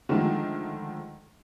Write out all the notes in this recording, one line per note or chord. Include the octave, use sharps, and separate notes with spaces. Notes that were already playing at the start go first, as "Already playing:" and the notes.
D3 D#3 F3 G#3 A3